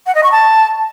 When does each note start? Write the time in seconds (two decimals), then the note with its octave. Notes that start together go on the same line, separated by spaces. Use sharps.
0.06 F#5
0.15 D#5
0.23 C#6
0.32 A5